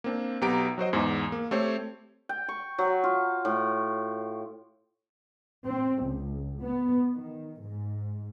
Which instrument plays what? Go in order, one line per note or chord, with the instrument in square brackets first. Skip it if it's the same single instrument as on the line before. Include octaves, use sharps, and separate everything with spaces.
[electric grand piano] A#3 C4 D4
B1 B3 G4 A#5 D7
F#3 F#4 C5 D#5
E2 G#2
A#3
A3 C4 G4 C5 C#5
[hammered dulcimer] G5
C#6
F#3
F4
A2
[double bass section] C4
C#2
B3
D#3
G#2